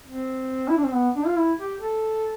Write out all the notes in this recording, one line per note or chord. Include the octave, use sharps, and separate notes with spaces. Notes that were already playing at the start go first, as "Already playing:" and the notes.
C4
E4
D4
C4
B3
D4
F4
E4
G4
A4